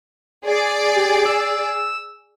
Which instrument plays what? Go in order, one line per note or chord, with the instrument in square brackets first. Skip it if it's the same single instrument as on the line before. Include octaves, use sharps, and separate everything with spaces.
[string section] G#4 D5
[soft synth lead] G4
E6